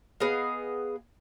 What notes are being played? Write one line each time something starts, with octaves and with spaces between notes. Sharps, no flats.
B3 G#4 D#5 F5